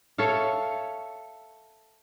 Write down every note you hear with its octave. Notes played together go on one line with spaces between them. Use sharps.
A4 C#5 E5 F5